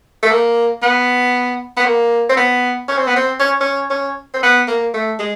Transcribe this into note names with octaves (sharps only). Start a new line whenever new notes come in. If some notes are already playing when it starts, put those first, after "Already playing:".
A3
A#3
B3
B3
A#3
C4
B3
C#4
C4
B3
C4
C#4
C#4
C#4
C4
B3
A#3
A3
G#3